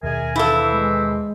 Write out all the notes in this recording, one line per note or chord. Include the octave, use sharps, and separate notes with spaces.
D#2 B2 G#4 A#4 E5 G#5
E3 C4 E4 A4 F5
G#3